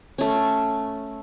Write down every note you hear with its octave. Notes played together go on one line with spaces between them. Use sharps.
A3 C#4